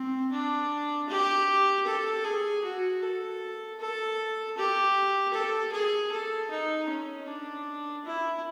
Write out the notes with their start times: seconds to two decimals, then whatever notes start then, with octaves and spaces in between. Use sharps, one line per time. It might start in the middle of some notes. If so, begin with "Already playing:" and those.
Already playing: C4
0.31 D4
1.09 G4
1.87 A4
2.24 G#4
2.64 F#4
3.02 A4
3.79 A4
4.57 G4
5.33 A4
5.72 G#4
6.12 A4
6.50 D#4
6.89 C#4
7.26 D4
8.04 E4